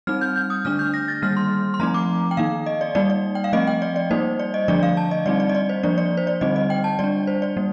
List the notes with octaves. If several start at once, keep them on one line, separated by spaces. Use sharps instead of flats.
G3 C4 D#4 F6
G6
G6
D#6
D3 A3 D4 F6
G6
A#6
A6
D#3 G3 A#3 F6
C6
C6
F3 A3 C4 D#4 A#5
D6
G5
D#3 A#3 D#4 F5
D#5
D5
G3 A#3 D#4 D5
D5
G5
F5
F3 A3 C4 D#5
G5
D5
D5
G3 A#3 D#4 C5
D5
D#5
D3 F3 A3 D4 D5
F5
A5
D#5
G3 C4 D#4 D5
D5
D#5
D5
C5
F3 A#3 D4 D5
D5
C5
D5
D3 G3 C4 D#4 D#5
D#5
G5
A5
G3 D4 D5
C5
D5
G3 A#3